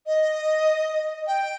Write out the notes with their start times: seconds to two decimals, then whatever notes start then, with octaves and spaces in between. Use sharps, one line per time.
0.06 D#5
1.27 G5